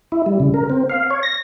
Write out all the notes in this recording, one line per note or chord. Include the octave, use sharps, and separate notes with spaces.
E4
G3
C#3
A#4
C4
F5
C#5
A#6